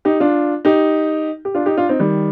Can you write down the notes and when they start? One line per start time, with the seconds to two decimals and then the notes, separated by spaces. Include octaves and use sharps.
0.05 D#4 G4
0.20 D4 F4
0.65 D#4 G4
1.45 G4
1.55 D4 F4
1.66 D#4 G4
1.77 D4 F4
1.89 C4 D#4
2.00 D#3 G3